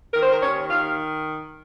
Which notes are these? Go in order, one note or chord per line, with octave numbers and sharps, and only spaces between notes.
D#3 A#4
C5
A#4
D#2 C#5
D#3 F5